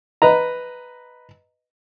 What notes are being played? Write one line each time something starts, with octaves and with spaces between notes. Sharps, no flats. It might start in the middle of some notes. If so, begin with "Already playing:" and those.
B4 D#5 A#5